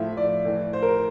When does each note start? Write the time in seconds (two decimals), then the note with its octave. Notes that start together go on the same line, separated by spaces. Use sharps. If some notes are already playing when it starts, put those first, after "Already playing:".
Already playing: A2 F3 E5
0.17 D5
0.45 A2 E3
0.73 C5
0.83 A#4